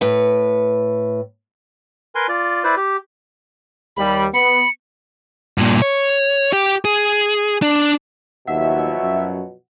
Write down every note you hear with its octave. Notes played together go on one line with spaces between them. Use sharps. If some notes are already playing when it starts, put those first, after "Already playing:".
A2 B4
A#4 B4 G#5 C6
F4 D5
E4 B4 C5 D5
G4
D#2 G3 B5
B3 B5 C#7
G2 A#2
C#5
G4
G#4
D4
D#2 B2 F3 F#3 E5 F#5
F#2